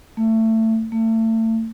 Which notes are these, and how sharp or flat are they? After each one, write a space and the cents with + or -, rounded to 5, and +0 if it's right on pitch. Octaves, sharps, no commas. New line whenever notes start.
A3 +20
A3 +30